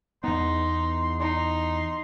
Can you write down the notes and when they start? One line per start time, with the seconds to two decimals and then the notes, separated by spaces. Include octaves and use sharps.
0.24 E2 B3 D#4 C6
1.20 D#4 C6